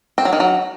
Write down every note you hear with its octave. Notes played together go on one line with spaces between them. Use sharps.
C4
F#3
D#3
F#3